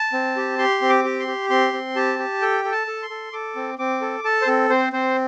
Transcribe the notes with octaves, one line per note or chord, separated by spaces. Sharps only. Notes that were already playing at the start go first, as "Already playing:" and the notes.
Already playing: A5
C4
G4
G4 C6
C4
D6
G4
C6
G4
C4 C6
C4
G4 A5
G4
A4 G5
A4
A5
A4
C6
A4
A4 D6
C4
C4 D6
A4
A4 A5
C5
C4 A4
C4 C5
C4 C5